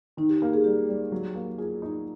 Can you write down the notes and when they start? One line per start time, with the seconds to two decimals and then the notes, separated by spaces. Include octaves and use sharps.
0.17 D#3 D#4
0.29 G4
0.41 A#3 G4
0.54 G#4
0.64 G3 G4
0.89 G3
1.12 F#3
1.35 A#3
1.58 F4 G#4
1.82 D#4